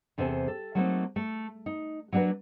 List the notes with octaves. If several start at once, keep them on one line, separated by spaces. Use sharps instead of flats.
E2 C3 A4 C5 G5 G#5
A4
F#3 A3 A#3 C4 D#4 F#4
A3
D#4
F#3 A#3 D4 F#4 B4